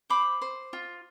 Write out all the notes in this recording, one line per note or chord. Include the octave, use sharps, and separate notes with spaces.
C5 B5 D6
C5
F4